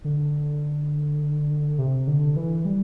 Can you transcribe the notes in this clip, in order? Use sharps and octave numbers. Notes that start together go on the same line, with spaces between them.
D3
C3
D3
E3
G3